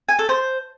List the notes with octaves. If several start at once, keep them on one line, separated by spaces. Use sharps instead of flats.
G#5
A4
C5